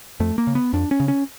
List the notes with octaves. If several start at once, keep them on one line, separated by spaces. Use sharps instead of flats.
F2 A3
A#3
C#3
B3
F2 D4
C#4
C#3
C#4